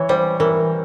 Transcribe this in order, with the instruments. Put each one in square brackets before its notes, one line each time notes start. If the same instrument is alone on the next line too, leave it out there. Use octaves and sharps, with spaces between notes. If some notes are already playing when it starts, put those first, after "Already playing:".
Already playing: [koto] E3 [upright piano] C#5
[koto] G3 [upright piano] C5
[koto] E3 [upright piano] A#4